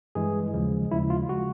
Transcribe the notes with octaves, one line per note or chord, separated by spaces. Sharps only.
G2 E3 G#3 G#4
D#2 C#3 F3 G#3
D#2 C#3 F3 G#3 E4
F4
C#3 F3 G#3 F#4